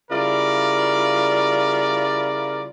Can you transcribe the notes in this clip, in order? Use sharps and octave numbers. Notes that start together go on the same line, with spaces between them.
C#3 G3 E4 F4 A#4 D5